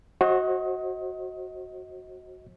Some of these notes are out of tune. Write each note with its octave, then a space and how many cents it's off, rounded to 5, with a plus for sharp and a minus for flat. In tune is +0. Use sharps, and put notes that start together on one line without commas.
F#4 +0 C5 +45 D#5 +25